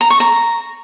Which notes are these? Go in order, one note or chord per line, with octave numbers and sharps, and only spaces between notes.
A#5
C#6
A#5